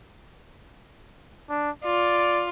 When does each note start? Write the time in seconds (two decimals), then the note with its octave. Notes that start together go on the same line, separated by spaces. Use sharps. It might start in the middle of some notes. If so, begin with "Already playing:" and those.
1.50 D4
1.84 F4 D5